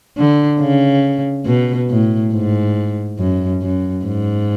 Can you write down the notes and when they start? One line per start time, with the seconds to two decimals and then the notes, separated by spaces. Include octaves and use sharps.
0.17 D3
0.60 C#3
1.46 B2
1.89 A2
2.33 G#2
3.19 F#2
3.62 F#2
4.05 G#2